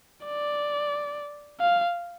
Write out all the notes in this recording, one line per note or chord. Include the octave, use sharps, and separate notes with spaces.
D5
F5